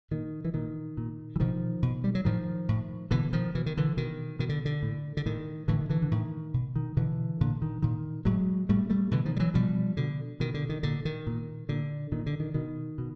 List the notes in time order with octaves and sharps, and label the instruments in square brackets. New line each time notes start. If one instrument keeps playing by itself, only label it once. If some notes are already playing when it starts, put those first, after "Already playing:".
[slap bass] A#2 D#3
E3
A#2 D#3
A#2
E3
B2 D#3 F3
B2
G3
F#3
A2 D#3 F3
A2
B2 D3 E3
D#3 F3
B2 E3
D#3
D3 E3
B2 D#3
B2 D#3
D3
D3
A2
D3
A2 D#3
A2 D3 E3
D#3
D3 E3
D3
A2 D#3
B2
D#3
B2 D3 E3
A#2 D3
D#3
A#2 D#3
A2 F#3 G#3
A2 G3 A3
G3 A3
B2 D3 E3
D#3 F3
G3
E3 F#3
B2 F3 G3
B2 D3
B2 D#3
D3
D#3
A#2 D3
D#3
A#2
A#2 D3
A#2 D#3
D3
D#3
B2 D#3
B2